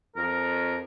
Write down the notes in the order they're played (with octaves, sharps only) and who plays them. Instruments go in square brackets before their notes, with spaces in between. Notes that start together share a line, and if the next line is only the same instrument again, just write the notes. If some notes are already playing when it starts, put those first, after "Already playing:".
[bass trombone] F2 [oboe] A#4